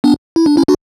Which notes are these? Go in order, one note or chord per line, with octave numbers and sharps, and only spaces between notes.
B3 D4
E4
D4
C#4 E4
D4 F#4